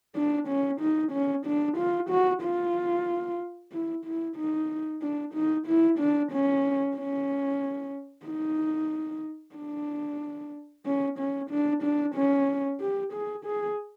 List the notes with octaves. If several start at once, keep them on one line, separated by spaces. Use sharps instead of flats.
D4
C#4
D#4
C#4
D4
F4
F#4
F4
E4
E4
D#4
D4
D#4
E4
D4
C#4
C#4
D#4
D4
C#4
C#4
D4
D4
C#4
G4
G#4
G#4